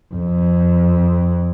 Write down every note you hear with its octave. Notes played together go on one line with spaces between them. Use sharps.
F2